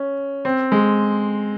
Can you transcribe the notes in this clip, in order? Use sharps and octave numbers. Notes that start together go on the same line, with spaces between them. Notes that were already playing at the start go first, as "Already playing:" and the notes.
Already playing: C#4
C4
G#3